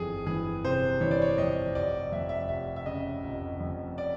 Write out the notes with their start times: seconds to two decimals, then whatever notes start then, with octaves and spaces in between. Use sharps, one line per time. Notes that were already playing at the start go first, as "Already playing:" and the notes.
Already playing: G1 F2 E3 G#4 A4
0.27 E3 G#4
0.64 C3 C5
1.01 E3 C#5
1.11 D5
1.22 C#5
1.38 F2 D#5
1.75 F1 D5
2.12 F2 E5
2.29 E5
2.49 F1 E5
2.76 E5
2.86 C#3 D#5
3.24 F1
3.60 F2
3.98 D5